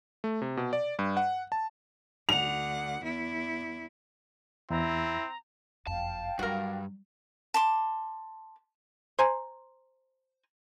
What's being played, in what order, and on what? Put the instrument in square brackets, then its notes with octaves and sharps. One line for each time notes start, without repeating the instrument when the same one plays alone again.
[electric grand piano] A3
C3
B2
D5
G2
F#5
A5
[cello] D2 F#5 [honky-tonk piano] F7
[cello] E2 E4
[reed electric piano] E2 [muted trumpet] C4 [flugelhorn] E4 [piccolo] A#5
[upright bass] F#1 F2 [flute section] F5 G5 [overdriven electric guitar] A5
[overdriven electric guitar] G2 [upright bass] F#3 G3 [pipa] F#4 A#4
[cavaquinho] A5 C6 D6
[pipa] C5 G#5 A#5